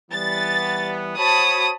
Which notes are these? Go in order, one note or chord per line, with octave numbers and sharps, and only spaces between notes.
E3 G3 B3 A6
F#4 C5 C#5 A5 B5 D#6